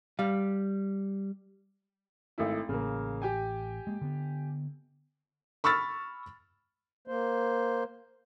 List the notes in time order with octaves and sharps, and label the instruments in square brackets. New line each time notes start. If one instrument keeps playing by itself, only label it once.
[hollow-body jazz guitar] G3 F5
[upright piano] G#1 A3 E4
[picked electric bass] A1 [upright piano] C#3 A#3
[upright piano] G4 G5 G#5
[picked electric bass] G#3 A#3
D3 B3
[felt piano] B5 C#6 E6 F6 A6
[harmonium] A#3 C5